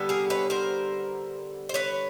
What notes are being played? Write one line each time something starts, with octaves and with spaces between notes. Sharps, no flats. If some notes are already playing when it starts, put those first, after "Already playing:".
Already playing: D3 G3 B3
G#4 A#4
B4 C#5
A#4 C5
C5
B4 C#5